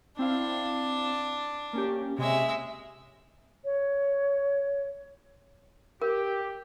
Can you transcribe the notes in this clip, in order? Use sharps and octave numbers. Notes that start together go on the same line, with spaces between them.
C4 D4 E4 F5
A#3 C#4 G4
C3 G#3 C#5 E5
C#5
G4 A#4